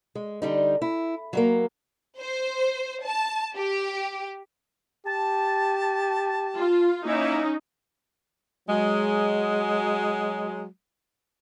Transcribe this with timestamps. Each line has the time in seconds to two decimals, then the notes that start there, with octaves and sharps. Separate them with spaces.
0.15 G#3
0.42 D3 G3 D#4
0.82 E4
1.33 F#3 G3 A#3
2.18 C5
3.04 A5
3.57 G4
5.06 G4 A5
6.56 F4
7.05 A#3 C#4 D#4 E4
8.69 F#3 G#3